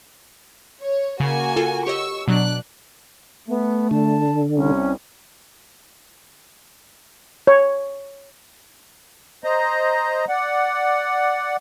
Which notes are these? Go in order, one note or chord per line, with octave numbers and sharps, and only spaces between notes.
C#5
C#3 A#3 F#4 G#5
F4 A4
G4 C#5 D#5 C#6 E6
B2 F#3 D4 D5 F#6
A3 B3
D3 A5
C2 C#4
C#5
C5 D#5 A#5
D5 F#5